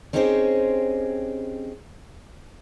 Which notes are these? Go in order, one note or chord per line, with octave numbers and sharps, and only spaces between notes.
C4 C#4 D#4 G4 G#4 C5